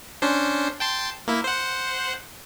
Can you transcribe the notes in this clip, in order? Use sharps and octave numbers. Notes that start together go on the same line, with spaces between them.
C#4 D4 C5
G5 A5 C6
A#3 E4
C5 F#5